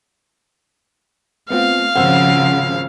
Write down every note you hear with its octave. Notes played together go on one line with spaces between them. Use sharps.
A3 B3 C4 F4 F5
G#1 C#3 F3 C5 F#5 E6